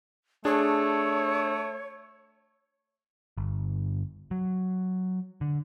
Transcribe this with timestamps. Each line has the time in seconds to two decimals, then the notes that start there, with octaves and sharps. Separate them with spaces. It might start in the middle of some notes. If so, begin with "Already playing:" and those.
0.45 A3 D4 G#4 C#5
3.37 G1
4.31 F#3
5.41 D3